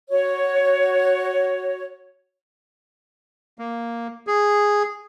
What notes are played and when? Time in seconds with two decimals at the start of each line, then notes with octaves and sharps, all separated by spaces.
0.10 F#4 C#5
3.59 A#3
4.27 G#4